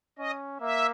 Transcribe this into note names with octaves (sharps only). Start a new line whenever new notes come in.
C#4 D#5
A#3 E5